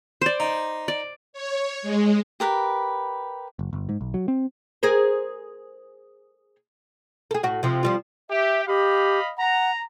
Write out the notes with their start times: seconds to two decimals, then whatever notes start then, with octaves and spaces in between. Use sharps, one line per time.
0.22 C5 D5
0.40 D#4
0.88 D5
1.33 C#5
1.82 G#3
2.40 G4 A#4 B4
3.59 F#1
3.73 G1
3.89 G#2
4.01 B1
4.14 F#3
4.28 C4
4.83 G#4 A#4 C5
7.31 G#4 A4
7.43 A2 F#4
7.63 C3 F3
7.83 F3 G3 F4
8.30 G4 E5
8.67 G4 D#5 F5 B5
9.38 F#5 A#5